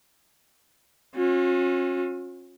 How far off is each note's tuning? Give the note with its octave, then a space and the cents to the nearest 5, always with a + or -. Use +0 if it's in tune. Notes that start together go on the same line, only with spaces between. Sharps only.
C#4 -35 F4 +45